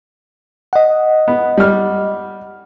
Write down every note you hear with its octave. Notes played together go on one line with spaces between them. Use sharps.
D#5 F#5
B3
G3 F6